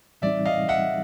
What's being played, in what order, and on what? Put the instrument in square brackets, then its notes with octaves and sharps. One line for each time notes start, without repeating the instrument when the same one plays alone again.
[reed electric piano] A2 E3 G3 C4 D#4 [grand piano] D5 E5
[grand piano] D#5 F5
E5 F#5